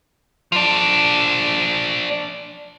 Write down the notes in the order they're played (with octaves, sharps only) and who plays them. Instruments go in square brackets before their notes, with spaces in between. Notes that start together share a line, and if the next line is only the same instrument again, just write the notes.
[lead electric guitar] F3 D4